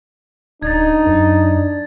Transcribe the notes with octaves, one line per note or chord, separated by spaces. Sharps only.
D1 D4 D#4 G#6 A6
F#2